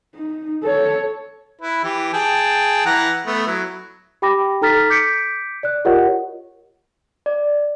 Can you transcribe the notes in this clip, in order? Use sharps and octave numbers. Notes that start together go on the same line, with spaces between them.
D#4
A4 C#5
E4 B4
E3 G4
G#4 G5 A5
E3 F#5 A#5
A3 B3
F#3 E4
G4 G5 B5 D6 A#6
D#4 A4 A#5 F6 A6 B6
D6 G6 B6 C#7 D7
D5 F#6
F4 G4 A#4 C#5 D#5 F#5
D5